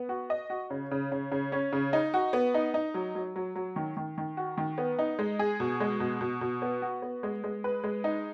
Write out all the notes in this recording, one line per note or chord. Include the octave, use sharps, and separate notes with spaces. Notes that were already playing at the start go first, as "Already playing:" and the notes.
Already playing: B3
F#4
D#5
F#4
C#3
C#3
C#3
C#3
C#4
C#3
D#4
F#4
B3
D#4
D#4
F#3
F#3
F#3
F#3
D#3
D#3
D#3
F#4
D#3
B3
D#4
G#3
G#4
B2
G#3
B2
B2
B2
B3
F#4
B3
G#3
G#3
B4
G#3
D#4